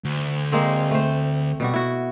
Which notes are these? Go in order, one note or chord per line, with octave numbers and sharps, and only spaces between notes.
D2
G#3 A#3 C4
A3 C5
B2 G3 F#4
E4 F#4